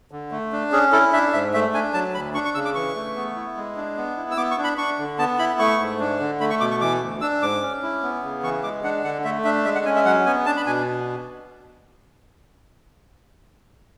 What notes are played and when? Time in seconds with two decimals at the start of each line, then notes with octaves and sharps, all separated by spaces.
0.11 D3
0.31 A3
0.52 D4
0.72 C#4 G#4
0.92 E4 A4
1.13 D4 E5
1.33 G#2 E5
1.54 A3 E5
1.74 D4 G#5
1.94 F#3 A5
2.14 D2 B5
2.34 D4 C#6
2.45 C#6
2.55 C#3 E6
2.65 D6
2.75 E3 C#6
2.95 A3
3.16 B3
3.36 E4
3.57 G#3
3.76 D4
3.97 B3
4.17 E4
4.31 E6
4.37 B3 D6
4.51 C#6
4.58 D4
4.64 B5
4.78 D4 C#6
4.99 D3
5.19 B3 A5
5.39 E4 B5
5.59 A3 C#6
5.79 G#2
6.00 D4
6.20 D3
6.40 A3 B5
6.50 C#6
6.60 B2 D6
6.71 C#6
6.81 E3 D6
7.01 D2
7.21 D4 E6
7.41 G#2 D6
7.62 C#4
7.82 E4
8.03 B3
8.23 C#3
8.43 E3 C#6
8.63 G#3 D6
8.84 D4 F#5
9.04 D3 F#5
9.24 A3 E5
9.44 D4 E5
9.65 G#3 E5
9.75 F#5
9.85 C#4 G#5
9.96 E5
10.05 F#3 F#5
10.26 B3 G#5
10.46 D4 A5
10.57 B5
10.66 B2 G#5